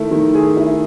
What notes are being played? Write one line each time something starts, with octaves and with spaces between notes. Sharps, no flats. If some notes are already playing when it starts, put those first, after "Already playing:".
Already playing: D#3 A3 E4
D#3
G#4
E4